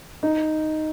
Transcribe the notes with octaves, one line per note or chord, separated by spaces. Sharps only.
D#4